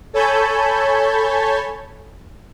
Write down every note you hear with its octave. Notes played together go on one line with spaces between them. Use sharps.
A4 C#5 G#5 A5 B5 G6